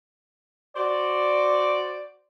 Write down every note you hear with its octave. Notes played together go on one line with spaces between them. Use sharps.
F#4 C5 D5